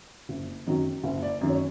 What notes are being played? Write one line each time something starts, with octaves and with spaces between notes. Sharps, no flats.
F#1
F#2 D#3 F#3
F#1
D5
F#2 D#3 F#3
C#5